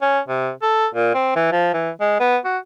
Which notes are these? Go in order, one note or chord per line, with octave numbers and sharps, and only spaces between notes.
C#4
C3
A4
A#2
C4
E3
F3
E3
G#3
B3
F#4